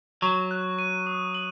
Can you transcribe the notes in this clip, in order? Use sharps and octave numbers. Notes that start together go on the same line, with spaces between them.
F#3 C#6
F#6
D#7
D#6
F#7